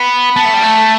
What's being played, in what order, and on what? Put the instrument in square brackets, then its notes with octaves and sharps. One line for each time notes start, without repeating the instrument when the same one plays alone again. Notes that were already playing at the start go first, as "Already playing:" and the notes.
Already playing: [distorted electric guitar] B3 [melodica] B5
[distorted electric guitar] B3 [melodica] A5
[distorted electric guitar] A3
G3
A3